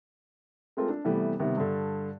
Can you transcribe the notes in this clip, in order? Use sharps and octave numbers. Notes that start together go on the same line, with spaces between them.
G#3 A3 C4 F4 A4 A#4
D4
C3 E3 G3 A3 B3
C3 D#3 G3 B3
G2 D3